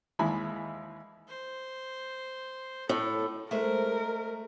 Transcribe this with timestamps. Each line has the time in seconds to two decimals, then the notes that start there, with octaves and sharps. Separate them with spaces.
0.19 D#2 E3 G#3 E4 G#5 B5
1.28 C5
2.89 A2 A4
3.51 G#3 A3 A#4 C5